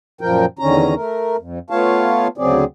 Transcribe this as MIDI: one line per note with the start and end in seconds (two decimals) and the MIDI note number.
0.21 0.45 42
0.21 0.45 46
0.21 0.45 53
0.21 0.45 70
0.21 0.45 79
0.59 0.95 40
0.59 0.95 50
0.59 0.95 51
0.59 0.95 61
0.59 0.95 82
0.95 1.37 57
0.95 1.37 70
1.38 1.59 41
1.70 2.28 57
1.70 2.28 59
1.70 2.28 65
1.70 2.28 73
1.70 2.28 77
1.70 2.28 81
2.38 2.65 38
2.38 2.65 49
2.38 2.65 54
2.38 2.65 60
2.38 2.65 68
2.38 2.65 74